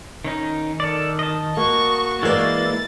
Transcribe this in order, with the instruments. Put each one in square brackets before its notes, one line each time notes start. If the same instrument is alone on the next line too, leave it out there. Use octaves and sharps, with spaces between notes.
[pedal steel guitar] D#3 C#4 D#4
[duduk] D#3 [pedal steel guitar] A4 D5
[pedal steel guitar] D#5 A5
[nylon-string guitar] A#3 [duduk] F#4 [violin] C#6
[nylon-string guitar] E3 A#3 D5 [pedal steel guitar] G#3 E4 [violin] A6